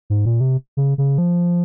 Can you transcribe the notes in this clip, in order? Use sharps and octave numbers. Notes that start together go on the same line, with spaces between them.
G#2
A#2
C3
C#3
C#3
F3